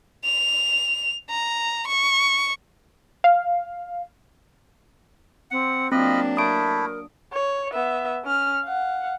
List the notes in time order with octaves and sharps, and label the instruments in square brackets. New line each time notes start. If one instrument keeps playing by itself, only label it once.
[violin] F7
A#5
C#6
[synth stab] F5
[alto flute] C4 [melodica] F#5
[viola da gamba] F#3 A#3 D4 [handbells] C4 [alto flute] F4 [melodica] D#5 B5
[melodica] A3 E4 [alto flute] A#4 [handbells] D#6 D7
[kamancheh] C#5
B3 E5
C#4 F6
F5 F#5